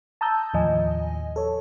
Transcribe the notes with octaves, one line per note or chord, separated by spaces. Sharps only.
A5 A#5 D#6 E6 G6
D#2 A2 F3 D#5 G#5
A4 C#5